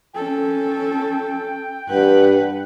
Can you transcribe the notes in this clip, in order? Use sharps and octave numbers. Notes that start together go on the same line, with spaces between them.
C#4 A4 G5
G2 B4 F#5